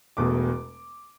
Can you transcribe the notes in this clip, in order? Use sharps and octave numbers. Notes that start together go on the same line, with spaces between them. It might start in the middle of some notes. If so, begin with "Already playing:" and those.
E1 E2 B2 A3 D6